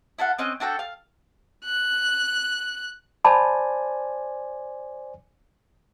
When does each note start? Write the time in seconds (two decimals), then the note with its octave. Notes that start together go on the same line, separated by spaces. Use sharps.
0.18 E4 A4 F5 F#5
0.38 C4 C#4 D#5 F#6
0.60 D4 F#4 A4 G5
0.79 F5
1.65 F#6
3.24 C5 D5 G#5 A5 B5